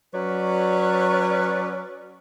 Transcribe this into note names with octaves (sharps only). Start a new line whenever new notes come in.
F#3 C#4 B4 C#5 D5